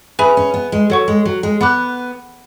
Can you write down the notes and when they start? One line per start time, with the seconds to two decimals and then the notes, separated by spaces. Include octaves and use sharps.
0.19 C#4 G#4 B4 E5 G#5 B5
0.37 C#4
0.54 B3
0.72 G#3
0.90 F#3 A4 C#5 F#5 C#6
1.08 G#3
1.25 F#3
1.43 G#3
1.61 B3 F#5 B5 D6 F#6